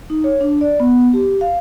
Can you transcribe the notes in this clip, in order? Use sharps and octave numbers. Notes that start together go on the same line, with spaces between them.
D#4
C#5
D4
D5
B3
G4
F5